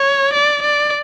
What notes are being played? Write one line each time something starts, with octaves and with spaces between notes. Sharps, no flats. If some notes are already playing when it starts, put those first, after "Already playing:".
Already playing: C#5
D5
D5